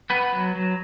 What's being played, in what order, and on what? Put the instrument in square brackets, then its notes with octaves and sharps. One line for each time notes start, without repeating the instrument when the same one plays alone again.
[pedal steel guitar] B3 B4
F#3
F#3